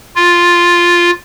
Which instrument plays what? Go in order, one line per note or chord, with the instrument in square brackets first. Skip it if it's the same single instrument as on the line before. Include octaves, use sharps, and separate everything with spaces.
[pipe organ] F4